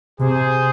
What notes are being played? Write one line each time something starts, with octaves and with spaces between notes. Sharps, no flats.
C3 G#4 C5